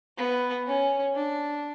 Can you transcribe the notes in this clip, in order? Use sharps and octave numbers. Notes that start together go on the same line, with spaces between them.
B3
C#4
D4